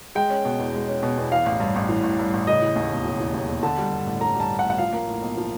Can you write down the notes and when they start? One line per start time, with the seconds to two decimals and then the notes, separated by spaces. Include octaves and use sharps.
0.15 G#3 G5
0.30 C#4
0.45 B2
0.59 E2
0.74 G#3
0.88 C#4
1.03 B2
1.18 E2
1.32 E3 F5
1.46 A1
1.60 G2
1.76 A1
1.89 E3
2.04 A1
2.19 G2
2.34 A1
2.47 C#3 D#5
2.62 E3
2.76 D#2
2.91 E1
3.05 C#3
3.20 E3
3.34 D#2
3.49 E1
3.63 D3 A5
3.78 G3
3.93 G2
4.07 A1
4.21 D3 A#5
4.35 G3 A5
4.50 G2
4.59 F#5
4.64 A1
4.70 F#5
4.78 F3 F5
4.93 A#3
5.07 A2
5.22 B1
5.37 F3